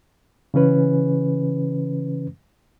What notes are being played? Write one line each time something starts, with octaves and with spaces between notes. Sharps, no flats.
C#3 E3 C#4 B4